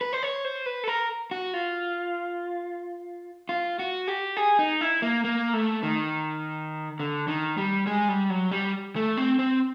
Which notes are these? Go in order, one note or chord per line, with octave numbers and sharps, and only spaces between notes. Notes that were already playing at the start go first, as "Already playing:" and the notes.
B4
C5
C#5
C5
B4
A4
A#4
F#4
F4
F4
F#4
G4
G#4
D#4
E4
A#3
A#3
A3
D#3
D3
D#3
G3
G#3
G3
F#3
G3
A3
C4
C4